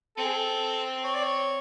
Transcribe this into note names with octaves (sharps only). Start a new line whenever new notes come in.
C4 A4
G#4
A4
C#5
D5
C#5